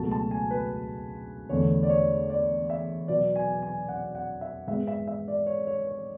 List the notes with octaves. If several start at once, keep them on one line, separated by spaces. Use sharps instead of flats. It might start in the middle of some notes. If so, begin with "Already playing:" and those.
Already playing: C#2 B2 F#3 A3 A5
A5
G#5
B4
E2 D3 A3 C#5
D5
C#5
D5
E5
B2 F#3 B3 D5
G#5
G#5
F#5
F#5
E5
G#2 G#3 B3 E5
E5
E5
D5
C#5
C#5
C#5